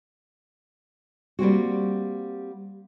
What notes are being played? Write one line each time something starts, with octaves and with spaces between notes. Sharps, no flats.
G3 A#3 C4 F#4